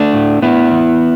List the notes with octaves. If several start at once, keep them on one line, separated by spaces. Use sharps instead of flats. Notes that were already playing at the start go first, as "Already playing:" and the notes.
Already playing: A3 D4
A2
A2 B3 E4
E3